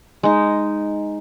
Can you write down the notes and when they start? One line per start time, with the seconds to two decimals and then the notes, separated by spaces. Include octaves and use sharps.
0.23 G#3 D#4